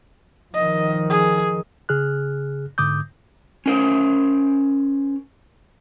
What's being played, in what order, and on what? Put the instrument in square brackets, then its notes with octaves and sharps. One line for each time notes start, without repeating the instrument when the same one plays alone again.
[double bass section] D#3 F3 [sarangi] D#5
[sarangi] G#4
[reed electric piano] C#3 G#4 F6 F#6
G#2 D3 D6 D#6 G6
[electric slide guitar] C#4 A#4 C5